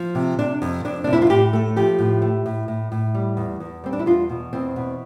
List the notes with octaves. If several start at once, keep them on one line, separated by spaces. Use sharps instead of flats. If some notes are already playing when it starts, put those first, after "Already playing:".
Already playing: F3
C3
C3 D4
F2
F2 D4
C3 D4
E4
F4
A2 G4
A3
F3 G4
A2
A3
A2
A2
A2
G3
E2
E2
G3 C4
D4
E4
E2 F4
B2
E2 C4
B2